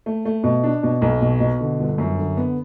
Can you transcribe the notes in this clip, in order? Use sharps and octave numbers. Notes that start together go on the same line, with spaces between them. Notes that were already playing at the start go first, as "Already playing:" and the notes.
A3
A3
B2
D4
B2
B1
B2
B2
D3
G1
F#2
D3
B3